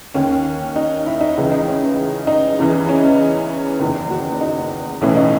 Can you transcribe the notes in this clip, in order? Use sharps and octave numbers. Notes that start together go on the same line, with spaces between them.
D#2 D#3 C#4
D#4
E4
D#4
C#2 C#3 E3
D#4
C#4
D#4
E2 C#3 E3
C#4
F#1 E2 D#3
F#4
D#4
B1 A2 E3 C#4
D#4